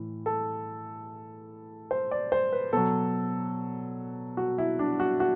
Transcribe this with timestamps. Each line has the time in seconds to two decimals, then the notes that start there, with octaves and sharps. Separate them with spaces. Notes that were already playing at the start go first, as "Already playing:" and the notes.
Already playing: A2 E3
0.26 A4
1.91 C5
2.11 D5
2.32 C5
2.53 B4
2.73 B2 F#3 A4
4.37 F#4
4.58 E4
4.79 D4
5.00 F#4
5.20 F#4